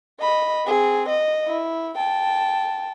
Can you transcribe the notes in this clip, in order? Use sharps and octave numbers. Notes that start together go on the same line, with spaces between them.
D#5 B5
C4 G#4
D#5
E4
G5 A5